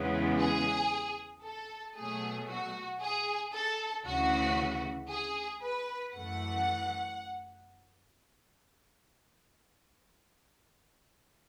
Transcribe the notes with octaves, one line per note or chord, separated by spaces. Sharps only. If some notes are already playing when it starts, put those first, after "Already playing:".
Already playing: E2 C#3 E3 G#3 B3
G#4
A4
B2 F#3 A3 G#4
F#4
G#4
A4
D2 C#3 E3 F#4
G#4
B4
F#2 E3 A3 F#5